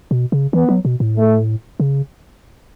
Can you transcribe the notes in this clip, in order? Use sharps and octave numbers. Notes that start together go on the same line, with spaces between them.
B2
C#3
E3 B3
F#3
B2
A2
A3
C#3